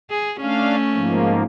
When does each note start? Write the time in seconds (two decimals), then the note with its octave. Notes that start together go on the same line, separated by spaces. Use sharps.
0.10 G#4
0.41 A3 C#4 D4 F5
0.93 G#2 F3 A#3